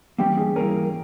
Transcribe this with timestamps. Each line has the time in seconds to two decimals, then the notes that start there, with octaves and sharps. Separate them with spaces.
0.18 E3 G3 A#3 C#4 G4
0.37 G#4
0.56 E3 G3 A#3 C#4 A#4